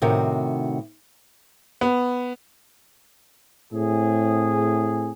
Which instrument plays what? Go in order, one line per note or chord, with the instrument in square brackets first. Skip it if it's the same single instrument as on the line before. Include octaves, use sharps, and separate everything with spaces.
[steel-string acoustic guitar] A2 C3 D#3 F#4
[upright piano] B3
[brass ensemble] A2 C4 G#4